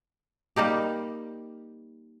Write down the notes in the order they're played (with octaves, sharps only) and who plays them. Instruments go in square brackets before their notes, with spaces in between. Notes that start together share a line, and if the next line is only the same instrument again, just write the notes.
[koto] G3 A#3 D#4 G4